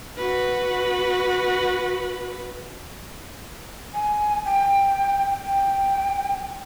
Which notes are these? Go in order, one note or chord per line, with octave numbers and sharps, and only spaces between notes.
F#4 B4
G#5
G5
G5